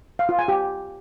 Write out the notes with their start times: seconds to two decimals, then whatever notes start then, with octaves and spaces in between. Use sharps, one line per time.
0.19 F5
0.29 F4
0.39 G#5
0.48 G4